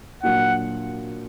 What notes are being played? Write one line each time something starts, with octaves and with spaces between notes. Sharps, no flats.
A#2 F#3 A#3 D4 F#4 F#5